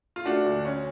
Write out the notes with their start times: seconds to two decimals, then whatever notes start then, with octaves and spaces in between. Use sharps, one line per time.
0.16 F4
0.25 A3 D4 F#4
0.46 D2
0.65 C#4